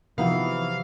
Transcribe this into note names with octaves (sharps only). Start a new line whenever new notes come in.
C3 E3 F3 B3 D#4 E4 F#4 F5